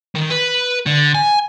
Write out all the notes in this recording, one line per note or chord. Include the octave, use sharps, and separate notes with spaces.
D#3
B4
D3
G#5